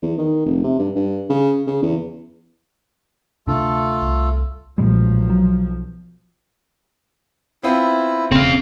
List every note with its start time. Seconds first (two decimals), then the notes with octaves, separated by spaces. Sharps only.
0.03 E2
0.18 D#3
0.46 F1
0.64 C3
0.79 G2
0.95 G2
1.29 C#3
1.67 C#3
1.82 E2
3.47 D2 C3 A3 D4 F4 A4
4.02 C2
4.78 B1 A#2 F3 G3 G#3
5.30 F#3
7.63 B3 C4 E4 F4
8.32 E1 C#3 C4 F5